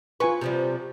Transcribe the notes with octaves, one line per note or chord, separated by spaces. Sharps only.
F4 B4 G#5 C#6
C3 F3 G3